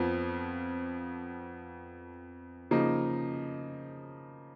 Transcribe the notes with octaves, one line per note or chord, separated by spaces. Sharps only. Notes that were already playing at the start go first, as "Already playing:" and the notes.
Already playing: F2 F3 B3 F4
C#3 F3 A#3 D#4